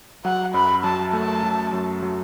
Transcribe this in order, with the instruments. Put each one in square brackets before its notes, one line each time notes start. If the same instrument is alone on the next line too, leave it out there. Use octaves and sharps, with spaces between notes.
[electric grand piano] F#3 [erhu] F#5
[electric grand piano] F#2 [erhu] B5
[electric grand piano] F#3 [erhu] A5
[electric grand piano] A3 [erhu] A5
[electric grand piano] F#3
F#2
F#3